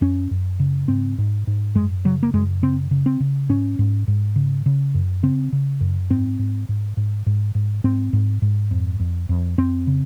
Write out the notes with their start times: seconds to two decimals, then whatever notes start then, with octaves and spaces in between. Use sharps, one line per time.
0.01 F#2 C#4
0.31 F#2
0.60 C#3
0.88 G#2 C4
1.18 G#2
1.47 G#2
1.75 F#2 G#3
2.05 C#3 F#3
2.23 A#3
2.34 F#2 G#3
2.62 C#3 C4
2.91 C#3
3.06 C4
3.20 C#3
3.49 G#2 C#4
3.79 G#2
4.08 G#2
4.36 C#3
4.66 C#3
4.94 F#2
5.23 C#3 C4
5.52 C#3
5.81 F#2
6.10 G#2 C4
6.39 G#2
6.69 G#2
6.97 G#2
7.26 G#2
7.55 G#2
7.84 G#2 C4
8.13 G#2
8.42 G#2
8.71 F2
9.00 F2
9.29 F2
9.58 F2 C4
9.87 C#3